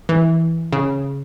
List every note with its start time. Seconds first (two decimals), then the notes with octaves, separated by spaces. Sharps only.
0.09 E3
0.73 C#3